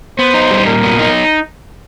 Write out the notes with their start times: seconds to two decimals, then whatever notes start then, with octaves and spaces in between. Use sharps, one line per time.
0.18 B3 C5
0.34 D#4
0.51 G3
0.66 A#2 A#4
0.83 B3
0.99 D#4